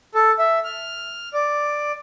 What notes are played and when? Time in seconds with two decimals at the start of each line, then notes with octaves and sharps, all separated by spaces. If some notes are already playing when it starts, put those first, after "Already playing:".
0.15 A4
0.39 E5
0.65 F6
1.34 D5